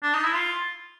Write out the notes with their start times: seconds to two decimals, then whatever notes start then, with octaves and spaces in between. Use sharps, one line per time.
0.03 D4
0.14 D#4
0.25 E4
0.34 F4